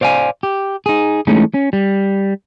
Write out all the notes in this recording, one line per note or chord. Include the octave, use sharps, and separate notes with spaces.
C5 D5 F5 F#5 G#5
G4
D#4 G#4
E3 G#3 A3 C#4 D#4
C#4
G3